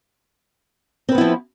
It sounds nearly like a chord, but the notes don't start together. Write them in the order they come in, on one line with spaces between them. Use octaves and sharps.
C4 B4 B3 E4 F3